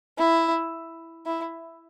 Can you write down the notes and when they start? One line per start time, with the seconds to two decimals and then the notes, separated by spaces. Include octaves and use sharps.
0.19 E4
1.26 E4